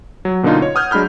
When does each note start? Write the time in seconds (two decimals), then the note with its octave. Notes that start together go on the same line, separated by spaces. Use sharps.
0.25 F#3
0.43 B2 D3 A#3 C#4 D#4 F4
0.62 C#5
0.75 F#5 D#6 F6 G6 G#6
0.91 F#3 G#3 D4 B5 F6 G6